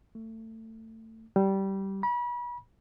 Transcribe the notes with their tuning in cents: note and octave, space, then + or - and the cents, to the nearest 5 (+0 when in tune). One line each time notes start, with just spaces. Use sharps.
A3 +25
G3 -15
B5 -35